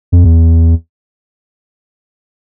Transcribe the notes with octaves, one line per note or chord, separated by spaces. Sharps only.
F2
E2